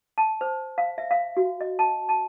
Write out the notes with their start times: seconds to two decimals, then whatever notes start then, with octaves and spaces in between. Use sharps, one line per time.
0.18 A5
0.41 C5
0.78 F5
0.98 E5
1.11 F5
1.37 F#4
1.61 D#5
1.79 A5
2.09 A5